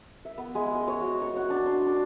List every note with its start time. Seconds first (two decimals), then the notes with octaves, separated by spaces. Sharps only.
0.25 E5
0.38 B3
0.55 G#3
0.75 D#5
0.88 C#5
1.01 F#4
1.21 C#6
1.37 F#5
1.50 D4
1.66 C6
1.86 D4